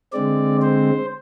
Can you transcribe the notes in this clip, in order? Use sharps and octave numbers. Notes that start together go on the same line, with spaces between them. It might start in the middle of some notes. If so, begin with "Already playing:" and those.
D3 G#3 C4 D5
C5